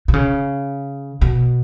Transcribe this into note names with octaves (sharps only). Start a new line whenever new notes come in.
B2
C#3
B2